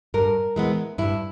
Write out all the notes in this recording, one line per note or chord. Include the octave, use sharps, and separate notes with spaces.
G2 A#4
E3 G#3 B3
G2 E4